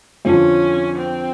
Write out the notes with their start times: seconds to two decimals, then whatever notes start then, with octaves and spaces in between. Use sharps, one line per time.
0.24 F2 D3 F3 C#4
0.97 C4